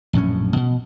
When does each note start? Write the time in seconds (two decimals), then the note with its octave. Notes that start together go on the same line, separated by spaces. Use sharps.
0.13 A#1 F#2 A2 C#4
0.56 B2